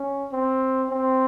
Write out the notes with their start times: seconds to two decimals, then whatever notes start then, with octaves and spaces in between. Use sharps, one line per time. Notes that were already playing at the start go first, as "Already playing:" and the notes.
Already playing: C#4
0.32 C4
0.90 C4